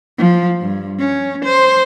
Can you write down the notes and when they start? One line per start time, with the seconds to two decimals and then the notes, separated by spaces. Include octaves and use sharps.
0.18 F3
0.61 G2
0.99 C#4
1.45 C5